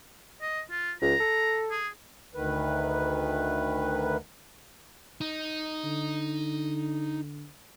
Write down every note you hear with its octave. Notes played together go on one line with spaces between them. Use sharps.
D#5
F4
C#2 A#5
A4
G#4
D2 D#3 B4
D#4
D3